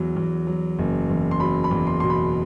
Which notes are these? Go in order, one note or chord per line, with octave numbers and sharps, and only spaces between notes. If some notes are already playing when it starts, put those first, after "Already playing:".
Already playing: E2 F#3
E2
F#3
F#1
E2
C6
F#3 B5
B5
E2
C6
B2 C6
B5